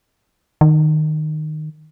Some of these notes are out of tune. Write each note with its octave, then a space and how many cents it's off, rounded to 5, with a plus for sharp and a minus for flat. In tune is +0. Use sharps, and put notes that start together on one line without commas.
D#3 -15